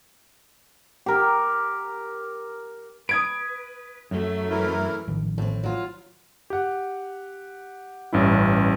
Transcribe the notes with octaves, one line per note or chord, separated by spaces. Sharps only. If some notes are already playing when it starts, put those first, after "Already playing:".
G4 A#4
B4 D#6 G#6 D7
F#2 F#3 A3
E3 E4 A#4
A1 D#3 F3
A2 C4
F#3 F4
G4 F#5
A1 G2 C#4 E4